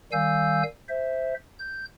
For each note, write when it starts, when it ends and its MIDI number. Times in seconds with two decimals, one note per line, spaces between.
0.12 0.63 51
0.12 0.63 55
0.12 0.63 77
0.12 0.63 80
0.12 0.63 88
0.12 0.63 91
0.89 1.34 72
0.89 1.34 76
1.59 1.85 91